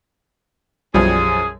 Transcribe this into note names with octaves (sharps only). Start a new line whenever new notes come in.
B1 F#2 F3 G3 C#4 G#4